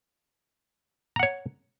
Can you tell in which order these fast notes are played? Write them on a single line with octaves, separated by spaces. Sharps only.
A#5 F#5 C#5